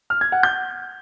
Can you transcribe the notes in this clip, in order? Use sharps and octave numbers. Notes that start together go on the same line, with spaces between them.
F6
G#6
F#5
G6